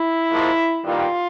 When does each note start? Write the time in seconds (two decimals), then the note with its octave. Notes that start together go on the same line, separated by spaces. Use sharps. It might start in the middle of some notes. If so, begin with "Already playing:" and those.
Already playing: E4
0.30 G#2 F3 A#3
0.85 G2 D#3 G3 A#3 F4